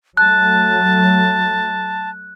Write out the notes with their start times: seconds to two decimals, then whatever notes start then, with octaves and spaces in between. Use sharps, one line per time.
0.17 F#3 A3 A5 F#6